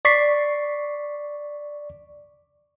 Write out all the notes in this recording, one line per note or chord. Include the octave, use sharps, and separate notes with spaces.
D5 C#6 B6 C7